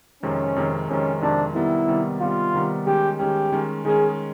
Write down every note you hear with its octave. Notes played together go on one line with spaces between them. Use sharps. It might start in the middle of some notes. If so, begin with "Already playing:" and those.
F2 C3 D#3 G#3 C#4
F2 C3 D#3 G#3
F2 C3 D#3 G#3 C#4
F2 C3 D#3 G#3 D4
C3 D#3 G3 B3 E4
C3 D#3 G3 B3
C3 D#3 G3 B3 F4
C3 D#3 G3 B3
D#3 G#3 C#4 G4
D#3 G#3 C#4 G4
D#3 G#3 C#4
D#3 G#3 C#4 G#4